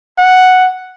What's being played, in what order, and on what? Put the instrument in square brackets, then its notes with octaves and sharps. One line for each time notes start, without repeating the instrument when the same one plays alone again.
[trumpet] F#5